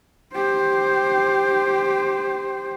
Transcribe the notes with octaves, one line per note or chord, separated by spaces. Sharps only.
G4 C5